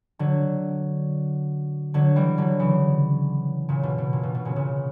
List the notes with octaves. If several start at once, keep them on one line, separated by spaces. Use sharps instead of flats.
D3 F#3
D3 F#3
E3 G3
D3 F#3
C#3 E3
A#2 C#3
B2
B2
A#2
B2
B2
A#2 C#3
A#2 C#3